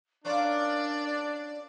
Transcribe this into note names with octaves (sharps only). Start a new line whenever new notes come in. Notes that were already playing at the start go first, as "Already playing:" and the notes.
C#4 D4 F4 A#4 D5